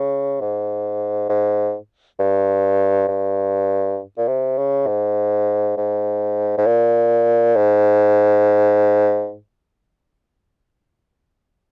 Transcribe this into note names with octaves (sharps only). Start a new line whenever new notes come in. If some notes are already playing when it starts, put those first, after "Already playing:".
Already playing: C#3
G#2
G#2
G2
G2
A#2
C3
C#3
G#2
G#2
G#2
A#2
G#2